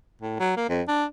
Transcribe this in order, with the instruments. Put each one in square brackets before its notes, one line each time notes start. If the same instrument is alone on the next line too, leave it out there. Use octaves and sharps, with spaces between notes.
[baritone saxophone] A2
F#3
A#3
F2
D4